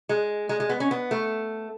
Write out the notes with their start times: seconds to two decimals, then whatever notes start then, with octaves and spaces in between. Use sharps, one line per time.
0.09 G#3
0.49 G#3
0.60 G#3
0.69 B3
0.80 C#4
0.91 B3
1.11 A3